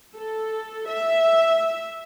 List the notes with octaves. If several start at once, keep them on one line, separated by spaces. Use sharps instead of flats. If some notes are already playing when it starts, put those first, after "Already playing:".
A4
E5